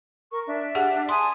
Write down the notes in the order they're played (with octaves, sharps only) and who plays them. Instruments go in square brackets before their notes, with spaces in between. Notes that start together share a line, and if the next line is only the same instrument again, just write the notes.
[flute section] A#4 C#6
D4 E5
[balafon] G4 G#4 F#5
[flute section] G#5 A5 D#6 [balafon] C6